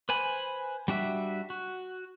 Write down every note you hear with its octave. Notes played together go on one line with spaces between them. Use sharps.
B4 C5 G#5 B5
G3 D4 F#4 E5
F#4